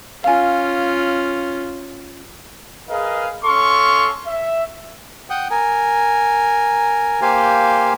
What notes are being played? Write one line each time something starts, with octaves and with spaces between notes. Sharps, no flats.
C#4 F4 F5 G#5
G#4 A#4 B4 D#5 F5
C#4 A4 F5 C6 C#6
E5
F#5 G5 D#6
A#4 G#5
A#3 G4 C5 F5 G#5